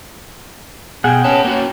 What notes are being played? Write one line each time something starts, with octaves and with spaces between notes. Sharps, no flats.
B2 G#4 F#5 G5
C#4 B4 A5
A#3 C#4 F#4